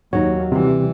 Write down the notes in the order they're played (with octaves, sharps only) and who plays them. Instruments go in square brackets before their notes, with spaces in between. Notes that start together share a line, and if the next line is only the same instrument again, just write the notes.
[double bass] D#2 [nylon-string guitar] F#3 D#4 [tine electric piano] C#5
[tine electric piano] C3 [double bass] E3 G3